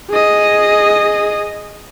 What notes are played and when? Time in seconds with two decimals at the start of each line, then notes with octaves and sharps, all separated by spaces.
0.10 G#4 D#5